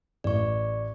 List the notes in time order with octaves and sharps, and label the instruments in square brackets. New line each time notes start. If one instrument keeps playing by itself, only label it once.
[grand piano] A1 [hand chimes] D5 C#6